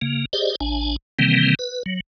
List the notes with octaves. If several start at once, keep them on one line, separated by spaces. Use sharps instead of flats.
C#3 A#3
G4 G#4 C5 D5 D#5
A1 D4 G#5
C3 D#3 E3 G3 A#3 C4
B4
F#3